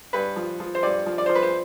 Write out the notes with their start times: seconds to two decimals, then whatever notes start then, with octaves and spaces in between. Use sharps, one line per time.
0.13 G2 B4
0.36 F3
0.60 F3
0.75 C5
0.83 G2 D5
1.06 F3
1.18 D5
1.26 F3 C5
1.35 B4
1.43 C5